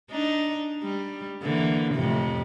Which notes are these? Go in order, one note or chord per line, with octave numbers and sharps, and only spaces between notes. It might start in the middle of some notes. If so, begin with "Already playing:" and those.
D4 D#4
G3
D3 E3 A#3
F2 A2 C3